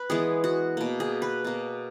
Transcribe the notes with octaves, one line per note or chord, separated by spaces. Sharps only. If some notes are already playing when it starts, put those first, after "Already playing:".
Already playing: B4
E3 G#3 B3 G#4
F#4
B2 A#3
G#4
B4
B2 A#3